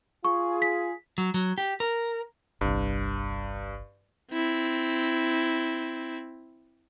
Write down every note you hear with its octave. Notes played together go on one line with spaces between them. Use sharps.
F4 G#4 C#6
B6
F#3
F#3
G4
A#4
G1 C2 G2
C4 E4